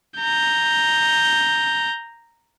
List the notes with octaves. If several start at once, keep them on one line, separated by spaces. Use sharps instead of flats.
A#5 G6